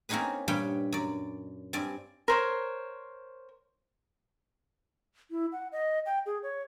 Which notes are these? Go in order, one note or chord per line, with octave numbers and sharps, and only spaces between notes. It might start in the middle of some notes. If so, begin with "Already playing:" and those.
A#3 C4 C#4 D#4 G#4 B4
G2 A#2 G3 B4 C#5 G5
F#2 D5
G2 C4 D5 G#5
A#4 C5 C#5
E4
F#5
D#5
G5
G#4
C#5